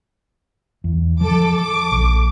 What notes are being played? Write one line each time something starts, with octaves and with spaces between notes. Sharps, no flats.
E2
F3 A4 D6
D6
A#1